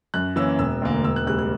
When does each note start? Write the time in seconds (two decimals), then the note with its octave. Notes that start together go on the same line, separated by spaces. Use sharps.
0.14 F#2 F#6
0.36 E3 A#3 C#4 E6
0.59 E1 E6
0.82 D2 D3 A#3
1.04 E1 E6
1.16 F#6
1.26 D2 C#3 G3 F#6
1.39 F#6